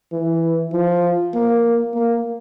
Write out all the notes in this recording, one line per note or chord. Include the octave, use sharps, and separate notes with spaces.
E3
F3
A#3
A#3